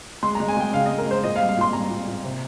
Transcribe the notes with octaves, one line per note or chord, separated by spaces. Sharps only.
G#3 C6
G#3 A#5
G#5
G#3 G5
C#3 F5
G#3 D#5
A#4
G#3 C5
A#2 D#5
F5
G3
F5
A#2 C6
G3 A#5
A#2
A#2
C3